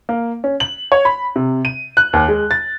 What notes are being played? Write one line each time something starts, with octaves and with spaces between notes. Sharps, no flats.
A#3
C#4
F#7
C#5
B5
C3
D#7
F#6
D#2
G#3
A6